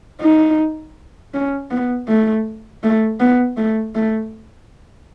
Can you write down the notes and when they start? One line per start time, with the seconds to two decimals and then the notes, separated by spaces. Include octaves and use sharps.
0.21 D#4
1.34 C#4
1.71 B3
2.08 A3
2.83 A3
3.20 B3
3.57 A3
3.95 A3